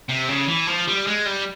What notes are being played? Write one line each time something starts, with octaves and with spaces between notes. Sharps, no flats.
C3
C#3
E3
F3
G3
G#3
G3